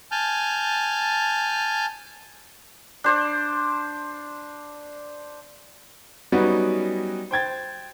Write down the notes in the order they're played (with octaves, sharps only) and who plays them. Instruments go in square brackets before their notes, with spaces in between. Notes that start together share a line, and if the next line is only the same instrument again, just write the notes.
[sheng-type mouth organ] G#5 A5 F6 G6
[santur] D4 C5 D5
[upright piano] F#3 G3 B3 C#4 D#4 F#4
C5 G5 G#6 A6